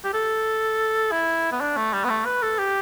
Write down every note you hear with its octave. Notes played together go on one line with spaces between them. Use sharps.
G4
A4
E4
B3
D4
A3
G3
B3
A3
B4
A4
G4